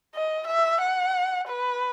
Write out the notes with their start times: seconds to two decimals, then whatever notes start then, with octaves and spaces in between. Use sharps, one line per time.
0.15 D#5
0.48 E5
0.81 F#5
1.48 B4